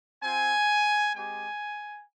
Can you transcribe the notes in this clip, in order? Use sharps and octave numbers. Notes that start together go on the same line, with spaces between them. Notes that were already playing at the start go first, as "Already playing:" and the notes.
C4 F4 G#5
G#3 C4 G4 G#5